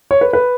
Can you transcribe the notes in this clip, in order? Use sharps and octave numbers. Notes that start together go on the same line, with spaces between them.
C#5
B4
B4